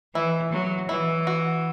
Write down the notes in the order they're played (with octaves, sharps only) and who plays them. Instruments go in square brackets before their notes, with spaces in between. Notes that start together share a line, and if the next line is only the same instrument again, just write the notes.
[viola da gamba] E3 [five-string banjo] E4
[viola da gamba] F#3
[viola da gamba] E3 [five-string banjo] E4
[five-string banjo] F#4